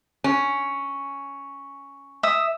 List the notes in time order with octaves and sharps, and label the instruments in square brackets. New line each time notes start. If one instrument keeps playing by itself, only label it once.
[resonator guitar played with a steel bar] C#4
[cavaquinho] E5 D#6